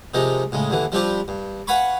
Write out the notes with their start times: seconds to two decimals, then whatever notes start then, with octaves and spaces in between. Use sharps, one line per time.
0.14 C3 D#3 F3 G#3 D#4
0.52 A2 C#3 G#3
0.70 D#2 D3 E3
0.92 F3 G3 C4 D4 F4 G4
1.28 G2
1.67 B4 F5 F#5 G#5 B5 C#6